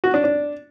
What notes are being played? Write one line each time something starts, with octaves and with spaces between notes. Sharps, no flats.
F#4
D4
D4